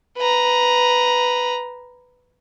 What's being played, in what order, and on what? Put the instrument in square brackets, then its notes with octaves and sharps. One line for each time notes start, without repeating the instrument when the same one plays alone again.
[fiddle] B4 A#5